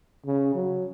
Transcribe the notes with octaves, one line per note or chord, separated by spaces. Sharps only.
C#3
F#3